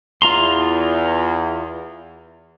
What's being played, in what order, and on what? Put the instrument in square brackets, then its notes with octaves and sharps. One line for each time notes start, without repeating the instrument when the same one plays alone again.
[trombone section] E2 [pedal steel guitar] F4 A#5 C6